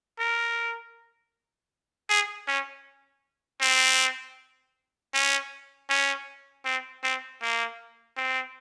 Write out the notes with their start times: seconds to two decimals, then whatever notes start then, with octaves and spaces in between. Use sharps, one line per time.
0.19 A#4
2.09 G#4
2.48 C#4
3.61 C4
5.14 C#4
5.90 C#4
6.65 C4
7.04 C4
7.42 A#3
8.17 C4